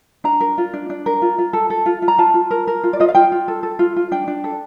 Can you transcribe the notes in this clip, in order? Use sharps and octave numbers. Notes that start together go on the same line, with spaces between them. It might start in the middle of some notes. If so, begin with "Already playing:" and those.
D4 A#5
A#4
F4
D4
D4
A#4
F4
F4
A4
A4
F4
F4
A#5
F4 A5
F4
A#4
A#4
F4
D5
F4 D#5
F5
F4 G5
F4
A4
A4
F4
F4
D4 G5
D4
A4